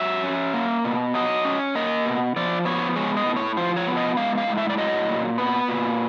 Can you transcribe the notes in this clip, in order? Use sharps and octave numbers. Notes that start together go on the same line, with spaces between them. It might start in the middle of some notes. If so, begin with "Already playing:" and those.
Already playing: F#3 E5
C#4
A#3
B2
F#3 D#5
C#4
A#3 D#5
B2
F3 D5
B3 C#5
G#3 C#5
D#5
A2
C#5
F3 C5
C#5
B3
D#5
G#3 F5
F5
A2
E5
D5
F#3 D#5
A#2
B3 B4
A#2